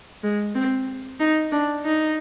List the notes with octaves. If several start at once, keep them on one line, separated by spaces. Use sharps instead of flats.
G#3
C4
D#4
D4
D#4